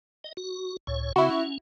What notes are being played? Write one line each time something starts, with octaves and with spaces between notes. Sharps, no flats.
D#5
F#4
C#2 A2 C#5
C#3 C4 E4 F#4
C#4